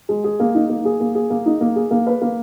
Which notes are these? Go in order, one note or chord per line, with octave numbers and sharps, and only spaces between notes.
G#3
G#4
A#3
D#4
A#3
G#4
A#3
G#4
A#3
D#4
A#3
G#4
A#3
B4
A#3